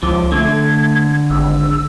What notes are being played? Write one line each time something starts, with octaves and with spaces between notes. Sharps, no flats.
C#2 F3 D6
D3 A3 G#6
G#1 E6